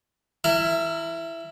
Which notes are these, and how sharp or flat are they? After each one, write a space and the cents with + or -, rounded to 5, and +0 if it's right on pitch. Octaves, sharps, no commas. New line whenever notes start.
E4 +10 A#4 -30